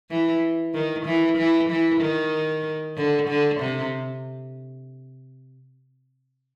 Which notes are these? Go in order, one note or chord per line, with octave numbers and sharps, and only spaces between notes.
E3
D#3
E3
E3
E3
D#3
D3
D3
C3